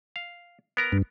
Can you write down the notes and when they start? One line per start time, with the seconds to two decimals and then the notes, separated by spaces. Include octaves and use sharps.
0.16 F5
0.77 B3 A#4 A#5
0.92 G2